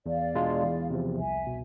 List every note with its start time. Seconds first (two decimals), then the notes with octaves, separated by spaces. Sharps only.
0.06 E2 D5 F5
0.35 B2 G#3 D4 F4
0.63 E2
0.90 C3 F3
1.18 C2 E5 G#5
1.47 B2